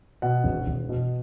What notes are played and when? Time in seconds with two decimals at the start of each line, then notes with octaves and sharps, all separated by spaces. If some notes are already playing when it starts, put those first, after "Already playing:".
0.22 B2 F#5
0.44 E1
0.67 E1
0.89 B2